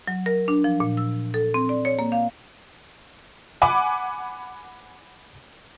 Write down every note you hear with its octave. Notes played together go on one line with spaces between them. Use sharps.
F#3
A#4
D4
F3
A#2
E6
A4
C4
D5
C#5
A#3
F5
F#5 G#5 B5 D6